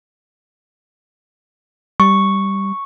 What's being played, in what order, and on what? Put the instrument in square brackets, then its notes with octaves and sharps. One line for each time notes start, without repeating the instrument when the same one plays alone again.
[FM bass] G3 [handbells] C#6